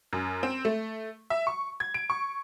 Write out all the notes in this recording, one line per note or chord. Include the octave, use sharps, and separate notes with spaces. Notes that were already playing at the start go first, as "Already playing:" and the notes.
F#2
C4
A3
E5
C#6
G#6
D7
C#6